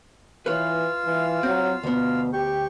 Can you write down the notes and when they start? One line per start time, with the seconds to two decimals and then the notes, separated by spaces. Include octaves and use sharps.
0.46 E3 F4 B4 C#5 F5 E6
1.05 E3
1.43 F#3 C4
1.83 D2 B2 B3
2.33 G4 G5 C#6